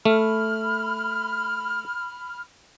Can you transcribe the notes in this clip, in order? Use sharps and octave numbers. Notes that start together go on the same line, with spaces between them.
A3 B5 F6